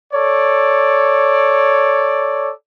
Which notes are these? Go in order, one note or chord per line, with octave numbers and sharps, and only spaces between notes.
A4 C#5 D5